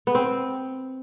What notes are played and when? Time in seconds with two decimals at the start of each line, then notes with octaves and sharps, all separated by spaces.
0.07 B3
0.15 C4